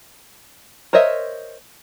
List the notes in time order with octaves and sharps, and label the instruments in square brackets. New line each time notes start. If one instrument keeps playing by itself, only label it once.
[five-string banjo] A#4 C5 C#5 D#5 E5